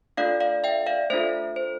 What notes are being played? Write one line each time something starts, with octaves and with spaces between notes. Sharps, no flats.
A3 D4 F4 A4 D5 F5
D5 F5
E5 G5
D5 F5
A3 D4 F4 A4 C5 E5
C5